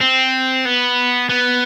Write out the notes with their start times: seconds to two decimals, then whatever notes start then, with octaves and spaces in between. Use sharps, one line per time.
0.01 C4
0.65 B3
1.30 B3